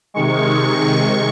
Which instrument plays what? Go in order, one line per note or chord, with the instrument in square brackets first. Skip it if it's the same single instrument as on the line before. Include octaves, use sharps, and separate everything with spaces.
[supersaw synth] C3 D#3 G#3 C#6